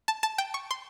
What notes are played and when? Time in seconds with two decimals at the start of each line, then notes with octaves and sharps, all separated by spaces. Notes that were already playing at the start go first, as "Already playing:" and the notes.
0.08 A5
0.23 A5
0.38 G5
0.54 C#6
0.71 C6